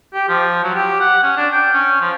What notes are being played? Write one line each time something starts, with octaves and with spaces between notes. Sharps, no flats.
G4
F3
F#3
G4
F#5
C#4
D4
G5
C#4
F3